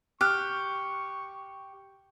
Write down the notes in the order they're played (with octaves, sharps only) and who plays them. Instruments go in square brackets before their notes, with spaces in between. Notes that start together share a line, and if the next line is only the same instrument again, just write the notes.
[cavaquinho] G4 [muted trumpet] C#6 [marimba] F6 F#6